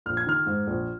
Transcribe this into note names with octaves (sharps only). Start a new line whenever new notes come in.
A#1 F6
G#6
D#3 F6
G#2
A#1